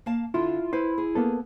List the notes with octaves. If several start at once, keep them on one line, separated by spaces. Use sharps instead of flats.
A#3 F5 A5
D3 E4 F4
E4 B4 C5
G#4
A#3 B3 A4